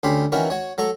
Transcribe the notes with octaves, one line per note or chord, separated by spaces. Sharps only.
D2 C#4 G4 B5 C6
D#3 E3 C#4 F#4 A#4 B4
F#4 C#5
F#3 A4 A#5 C#6